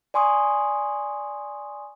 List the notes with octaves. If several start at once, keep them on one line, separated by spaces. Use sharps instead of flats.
D5 G#5 C6 C#6 D#6